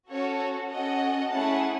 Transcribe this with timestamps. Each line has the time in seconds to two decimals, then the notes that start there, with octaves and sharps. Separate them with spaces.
0.10 C#4 F#4 A4 C#5
0.70 C#4 F#4 A4 D#5 F#5
1.30 A3 C#4 E4 G#4 F#5 A5